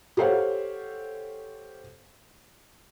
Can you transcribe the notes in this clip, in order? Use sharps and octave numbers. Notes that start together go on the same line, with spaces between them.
G4 A4 C5 C#5 F5 F#5